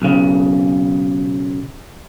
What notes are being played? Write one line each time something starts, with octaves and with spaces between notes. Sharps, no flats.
B1 C#3